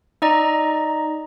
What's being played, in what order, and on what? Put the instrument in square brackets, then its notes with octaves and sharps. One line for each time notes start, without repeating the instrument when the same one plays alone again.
[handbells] D#4 D5 D#5 A#5